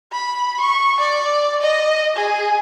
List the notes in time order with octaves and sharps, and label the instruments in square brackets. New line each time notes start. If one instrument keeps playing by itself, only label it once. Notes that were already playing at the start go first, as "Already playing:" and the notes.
[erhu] B5
C#6
D5
D#5
G#4